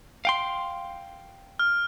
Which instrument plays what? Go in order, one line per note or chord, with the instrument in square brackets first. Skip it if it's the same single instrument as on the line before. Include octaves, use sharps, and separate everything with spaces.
[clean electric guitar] F5 G5 C6
[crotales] F6